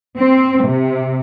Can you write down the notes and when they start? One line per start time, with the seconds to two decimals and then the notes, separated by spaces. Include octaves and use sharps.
0.18 C4
0.66 C3